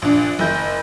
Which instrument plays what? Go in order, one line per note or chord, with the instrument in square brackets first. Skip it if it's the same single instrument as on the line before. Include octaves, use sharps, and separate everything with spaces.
[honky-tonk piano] A#1 D4
F#1 E4 G6